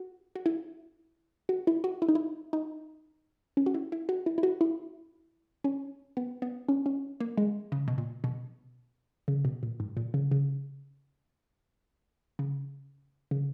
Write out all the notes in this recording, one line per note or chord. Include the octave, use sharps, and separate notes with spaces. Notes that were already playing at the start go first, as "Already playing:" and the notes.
Already playing: F#4
F#4
E4
F#4
E4
F#4
E4
D#4
E4
D#4
C#4
F#4
E4
E4
F#4
E4
E4
F#4
E4
C#4
B3
B3
C#4
C#4
A#3
G#3
C#3
B2
A#2
B2
C#3
B2
A#2
G#2
A#2
C#3
C#3
C#3
C#3